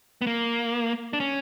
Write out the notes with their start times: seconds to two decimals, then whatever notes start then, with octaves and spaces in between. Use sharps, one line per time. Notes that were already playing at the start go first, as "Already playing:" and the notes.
0.21 B3
0.27 A#3
1.13 D4
1.20 C#4